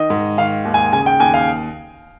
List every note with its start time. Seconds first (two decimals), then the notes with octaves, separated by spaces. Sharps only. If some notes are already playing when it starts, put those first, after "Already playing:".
Already playing: D#3 D#5
0.10 G#2
0.37 D#3 F5
0.65 D#2
0.74 G#5
0.93 C#3 G#5
1.06 G5
1.20 D#2 G#5
1.34 F5